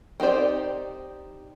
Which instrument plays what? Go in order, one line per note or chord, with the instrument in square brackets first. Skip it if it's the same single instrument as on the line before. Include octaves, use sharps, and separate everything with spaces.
[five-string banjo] C4 D#4 G4 C5 D5